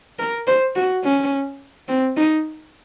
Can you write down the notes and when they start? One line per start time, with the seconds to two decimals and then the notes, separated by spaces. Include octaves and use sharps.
0.19 A#4
0.47 C5
0.76 F#4
1.04 C#4
1.88 C4
2.17 D#4